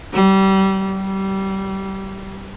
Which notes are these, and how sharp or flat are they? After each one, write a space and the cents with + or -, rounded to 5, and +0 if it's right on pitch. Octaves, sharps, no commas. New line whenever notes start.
G3 -25
G3 -20